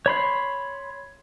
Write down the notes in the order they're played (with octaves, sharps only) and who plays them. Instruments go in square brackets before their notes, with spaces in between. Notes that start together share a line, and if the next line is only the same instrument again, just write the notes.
[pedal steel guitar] C#5 B5 C6